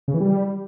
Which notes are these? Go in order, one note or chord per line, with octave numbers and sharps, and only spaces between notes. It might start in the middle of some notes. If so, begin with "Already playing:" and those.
C#3
E3
G3